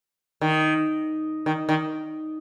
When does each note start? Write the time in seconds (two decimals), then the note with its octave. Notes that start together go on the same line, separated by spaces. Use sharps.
0.41 D#3
1.46 D#3
1.69 D#3